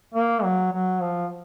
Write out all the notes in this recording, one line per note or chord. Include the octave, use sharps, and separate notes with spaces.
A#3
F#3
F#3
F3